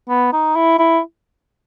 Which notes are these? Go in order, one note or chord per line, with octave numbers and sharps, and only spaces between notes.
B3
D#4
E4
E4